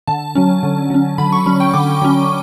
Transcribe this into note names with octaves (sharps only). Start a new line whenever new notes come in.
D3 A5
F#3 C#4
D3
F#3 C#4
D3 B5
C#6
F#3 C#4 B5
G5
D3 D6
F#3 C#4